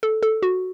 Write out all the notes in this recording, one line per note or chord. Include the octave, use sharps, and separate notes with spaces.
A4
A4
F#4